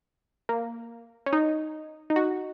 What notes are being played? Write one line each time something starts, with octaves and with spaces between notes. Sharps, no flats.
A#3
C#4
D#4
D#4
F#4